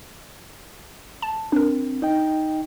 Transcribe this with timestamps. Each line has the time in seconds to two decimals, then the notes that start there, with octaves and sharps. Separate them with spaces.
1.22 A5
1.52 C4 D4 A#4
2.02 D#4 D#5 G5